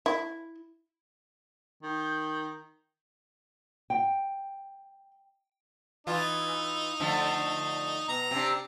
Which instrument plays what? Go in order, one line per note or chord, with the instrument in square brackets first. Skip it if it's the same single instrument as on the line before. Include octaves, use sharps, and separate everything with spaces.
[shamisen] E4
[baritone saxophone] D#3 [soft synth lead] G6
[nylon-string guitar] G5
[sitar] E3 F4 [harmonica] D#4
[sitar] D3 F3 A3
[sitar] B2 [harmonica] A#5
[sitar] C3 D4